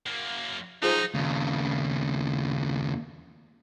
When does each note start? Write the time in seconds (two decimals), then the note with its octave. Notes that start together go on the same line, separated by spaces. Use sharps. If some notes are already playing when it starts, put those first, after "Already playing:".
0.06 F#2 A#3
0.83 F3 F#3 D#4 F4 G#4 C5
1.14 D#2 C#3